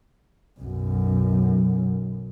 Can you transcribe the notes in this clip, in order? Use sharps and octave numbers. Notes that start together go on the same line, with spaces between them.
B1 F#2